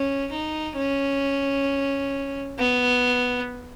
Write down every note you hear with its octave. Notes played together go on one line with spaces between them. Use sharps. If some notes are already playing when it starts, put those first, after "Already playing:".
Already playing: C#4
D#4
C#4
B3